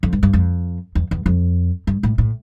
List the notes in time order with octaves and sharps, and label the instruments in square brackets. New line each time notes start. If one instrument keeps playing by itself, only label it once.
[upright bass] F2
G2
G2
F2
E2
E2
F2
G2
A2
A2